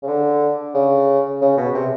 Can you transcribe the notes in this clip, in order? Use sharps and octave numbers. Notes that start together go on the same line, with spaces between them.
C#3
D3
C#3
C#3
B2
C3